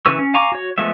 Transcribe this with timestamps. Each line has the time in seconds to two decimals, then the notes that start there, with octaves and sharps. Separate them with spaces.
0.06 C#3 E3 B4 C#6 E6
0.19 C#4
0.34 F5 G#5 A#5 C#6 D6
0.52 F#4 C#5
0.78 F3 G#3 A3 B3 E5